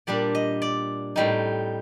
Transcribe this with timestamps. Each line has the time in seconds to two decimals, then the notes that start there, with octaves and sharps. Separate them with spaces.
0.07 A#2 G3 D4 D5
0.35 D#5
0.62 D5
1.16 A2 G3 C4 D#4